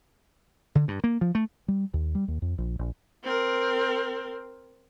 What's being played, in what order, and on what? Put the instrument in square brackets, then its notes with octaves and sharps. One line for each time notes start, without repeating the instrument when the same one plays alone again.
[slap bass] D3
G2
A#3
F3
A3
[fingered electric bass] G3
D#2
G3
D#2
F2
A#1
A#1
[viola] C4 A#4